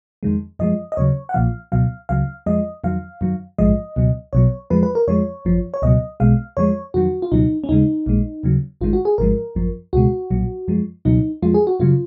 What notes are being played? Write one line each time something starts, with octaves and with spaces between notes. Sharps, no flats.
F2 D#3 G#3
F#2 F3 G#3 D#5
D#5
D#2 C#3 F#3 C#5
F#5
B1 A#2 F3 F5
C#2 B2 F#3 F5
C#2 C#3 F#3 F5
F2 F3 G#3 D#5
F2 D#3 F#3 F5
F#2 D#3 F#3
A#1 G#2 F3 G#3 D#5
C#2 B2 F#3
B1 B2 F#3 C#5
F2 F3 G#3 B4
B4
A#4
F2 F3 G#3 C#5
G#1 F#2 F3
C#5
C#2 B2 F#3 D#5
B1 B2 G#3 F5
F2 F3 G#3 C#5
F2 D#3 F#3 F#4
F4
C#2 B2 F#3 D#4
C#4
D#2 C#3 G#3 D#4
A#1 A#2 G#3
D#2 C#3 F#3
G#1 F#2 D#3 G#3 F4
F#4
G#4
G#1 G#2 F3 G#3 A#4
G#1 F#2 F3
C#2 B2 G#3 F#4
B1 A#2 F#3
F#2 F3 G#3
C#2 B2 F#3 D#4
F2 F3 G#3 F4
G#4
F#4
F#2 C#3 F#3 F4